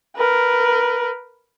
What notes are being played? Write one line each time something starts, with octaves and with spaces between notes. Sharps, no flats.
A#4 B4